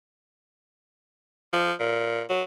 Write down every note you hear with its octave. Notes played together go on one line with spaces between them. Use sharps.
F3
A#2
F#3